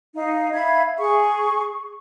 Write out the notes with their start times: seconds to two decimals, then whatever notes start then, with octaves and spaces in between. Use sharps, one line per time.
0.16 D#4 F5
0.53 E5 F5 B5 G#6
0.98 G#4 C#6